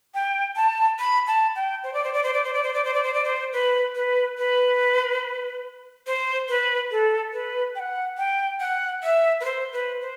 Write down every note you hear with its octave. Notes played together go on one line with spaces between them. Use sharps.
G5
A5
B5
A5
G5
C5
D5
C5
D5
C5
D5
C5
D5
C5
D5
C5
D5
C5
D5
C5
B4
B4
B4
C5
B4
A4
B4
G5
F#5
G5
F#5
E5
B4
C5
B4
C5